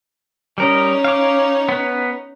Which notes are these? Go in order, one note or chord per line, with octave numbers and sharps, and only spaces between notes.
G3 C#4 D#4 A#4 D#5
F5 D6
B3 B4